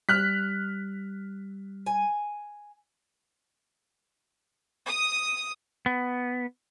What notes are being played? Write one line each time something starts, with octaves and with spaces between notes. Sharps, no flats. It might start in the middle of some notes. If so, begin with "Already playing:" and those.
G3 F6 F#6 B6
G#5
D#6
B3